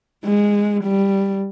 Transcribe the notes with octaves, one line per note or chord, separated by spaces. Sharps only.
G#3
G3